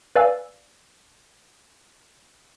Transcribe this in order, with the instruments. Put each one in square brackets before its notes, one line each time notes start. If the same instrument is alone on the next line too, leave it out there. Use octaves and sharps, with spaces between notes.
[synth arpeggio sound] B4 D5 F5 G#5 E6